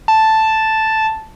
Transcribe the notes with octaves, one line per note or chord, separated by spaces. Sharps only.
A5